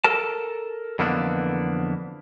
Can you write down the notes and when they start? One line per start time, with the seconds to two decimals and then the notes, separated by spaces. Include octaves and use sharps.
0.04 A4 A#4 A5
0.99 F2 D3 E3 A#3 B3 D4